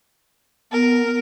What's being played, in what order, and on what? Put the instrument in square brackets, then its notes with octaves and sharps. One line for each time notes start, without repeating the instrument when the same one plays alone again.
[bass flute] B3 [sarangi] A#4